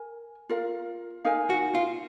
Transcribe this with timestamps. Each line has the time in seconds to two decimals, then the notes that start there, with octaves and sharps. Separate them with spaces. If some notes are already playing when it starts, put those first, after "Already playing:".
Already playing: A#4 G#5
0.49 F4 A#4 F5
1.24 D#4 A#4 F5 G#5
1.50 F#4
1.75 F4